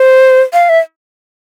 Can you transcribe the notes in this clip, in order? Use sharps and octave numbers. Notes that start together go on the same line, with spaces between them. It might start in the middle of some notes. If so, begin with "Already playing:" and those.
Already playing: C5
F5
E5